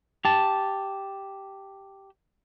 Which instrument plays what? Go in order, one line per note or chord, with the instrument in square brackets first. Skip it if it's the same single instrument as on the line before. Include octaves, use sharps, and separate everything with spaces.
[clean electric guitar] G4 A5